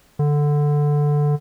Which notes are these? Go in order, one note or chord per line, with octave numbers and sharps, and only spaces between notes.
D3